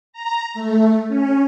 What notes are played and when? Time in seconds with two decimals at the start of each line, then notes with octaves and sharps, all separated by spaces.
0.13 A#5
0.54 A3
1.08 C#4